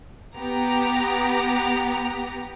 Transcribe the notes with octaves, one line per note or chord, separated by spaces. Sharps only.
B3 G4 A#5